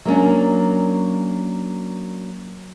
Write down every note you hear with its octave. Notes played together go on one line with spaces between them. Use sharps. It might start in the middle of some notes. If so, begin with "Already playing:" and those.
F#3 A#3 C#4 D4